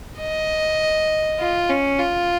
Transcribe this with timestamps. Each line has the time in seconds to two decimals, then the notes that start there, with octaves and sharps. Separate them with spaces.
0.19 D#5
1.39 F4
1.69 C#4
1.99 F4